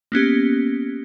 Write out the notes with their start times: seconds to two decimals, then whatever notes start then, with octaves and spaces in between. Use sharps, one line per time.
0.12 A#3 B3 C#4 G4